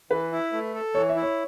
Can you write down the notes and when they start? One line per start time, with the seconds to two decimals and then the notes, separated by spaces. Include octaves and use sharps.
0.11 E3 B4
0.32 E4
0.53 A3
0.74 A4
0.95 E3 C#5
1.09 E5
1.16 E4
1.22 C#5